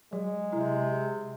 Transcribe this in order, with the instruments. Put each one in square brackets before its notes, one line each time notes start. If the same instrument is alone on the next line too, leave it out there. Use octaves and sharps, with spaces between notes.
[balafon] F#3 [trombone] G#3
[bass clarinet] C3 [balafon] E4